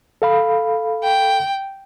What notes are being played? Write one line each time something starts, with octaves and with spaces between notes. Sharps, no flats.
A4 F5 B5
G5